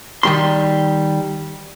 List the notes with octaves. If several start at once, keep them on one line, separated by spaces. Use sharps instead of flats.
D#3 G3 C6